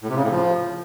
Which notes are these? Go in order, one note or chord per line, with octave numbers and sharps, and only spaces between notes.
A2
C3
C#3
A2
F3